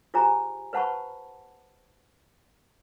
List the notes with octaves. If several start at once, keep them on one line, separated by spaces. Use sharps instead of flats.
F4 G4 G#4 C5 G#5 A#5
B4 C5 F#5 A5 B5 C#6